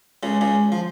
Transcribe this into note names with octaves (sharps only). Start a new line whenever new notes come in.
C#2 C#3
C#2 C#3
F3